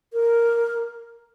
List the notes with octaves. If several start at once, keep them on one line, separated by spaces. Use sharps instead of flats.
A#4